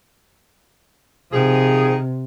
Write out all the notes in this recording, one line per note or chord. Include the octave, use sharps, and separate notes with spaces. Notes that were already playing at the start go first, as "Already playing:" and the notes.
C3 D#3 F3 G#4